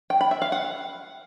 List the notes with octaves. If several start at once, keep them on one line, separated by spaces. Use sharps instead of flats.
G5
B5
E5
F5
F#5